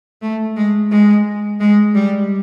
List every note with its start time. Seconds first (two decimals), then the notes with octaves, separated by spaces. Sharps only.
0.22 A3
0.57 G#3
0.91 G#3
1.60 G#3
1.95 G3